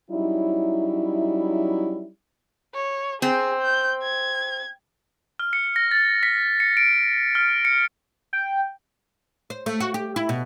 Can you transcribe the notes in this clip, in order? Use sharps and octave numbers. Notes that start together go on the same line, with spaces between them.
F#3 G3 C#4 D#4 E4
C#5
C4 G#4
G6
G#6
F6
C#7
A#6
A6
B6
C#7
D7
F6
C#7
G5
C5
A3
F#4
G4
E4
B2